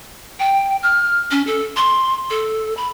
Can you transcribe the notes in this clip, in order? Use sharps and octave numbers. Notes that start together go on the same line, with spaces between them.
G5
F6
C#4
A4
C6
A4
B5